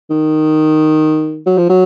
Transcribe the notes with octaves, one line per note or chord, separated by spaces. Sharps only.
D#3
F#3
F3
F#3